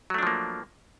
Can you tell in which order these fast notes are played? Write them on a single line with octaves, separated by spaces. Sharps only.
F#3 A3 D4 F3 A#3